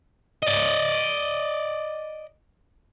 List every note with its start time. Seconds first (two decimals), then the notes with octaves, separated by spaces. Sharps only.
0.43 D5 D#5